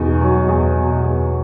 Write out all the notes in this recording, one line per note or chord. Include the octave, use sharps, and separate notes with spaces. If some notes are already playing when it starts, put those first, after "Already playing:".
Already playing: E2 B2 D#4
F#3
E2
B2
E2